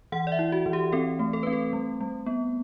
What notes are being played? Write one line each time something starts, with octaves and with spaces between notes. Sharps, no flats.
E3 F#5
D5
E5
E4
F#4
E3
G4
C4 A4
A3
A4
C4 B4
A4
G3
G3
B3